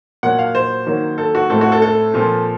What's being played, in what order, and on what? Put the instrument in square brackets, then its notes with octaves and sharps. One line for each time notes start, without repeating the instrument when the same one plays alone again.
[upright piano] A#2 F#3 A#3 F#5
F5
C5
D#3 F#3 A#3
A4
F#4
A2 A3 C4 A4
F#4
A4
A4
A#2 F3 C4